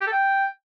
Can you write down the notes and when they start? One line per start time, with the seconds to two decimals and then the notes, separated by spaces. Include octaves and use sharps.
0.01 G4
0.07 A4
0.12 G5